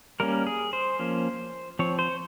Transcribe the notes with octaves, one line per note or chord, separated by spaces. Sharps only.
G3 A#3 C#4 A#4
G#4
C5
F3 A#3 C#4
F3 C4 C#5
C5